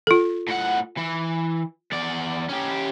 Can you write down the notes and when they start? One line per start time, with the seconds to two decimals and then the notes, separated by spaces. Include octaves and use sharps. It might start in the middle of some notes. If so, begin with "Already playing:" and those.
0.07 F4 A4
0.48 A2 F#5
0.97 E3
1.92 E2 D5
2.49 C#4 G4